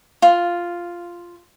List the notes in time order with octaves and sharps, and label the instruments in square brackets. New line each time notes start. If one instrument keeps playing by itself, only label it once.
[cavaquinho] F4